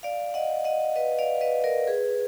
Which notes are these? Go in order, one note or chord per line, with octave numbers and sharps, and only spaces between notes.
D5 F5
D#5 F#5
D#5 F#5
B4 D#5
F#5
D5 F5
B4 D#5
A#4 D5
G#4 B4